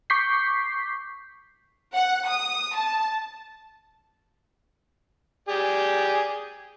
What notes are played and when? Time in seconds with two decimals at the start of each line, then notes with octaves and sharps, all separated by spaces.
0.10 C#6 D6 G6 B6 C7
1.94 F#5
2.28 D#6
2.76 A5
5.48 G4 G#4 D5